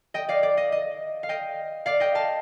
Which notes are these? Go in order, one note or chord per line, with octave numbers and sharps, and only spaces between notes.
D#5 G5
D5 F5
D5
D#5
D#5
F5
D#5 G5
D5 F5
D#5 G5
F5 A5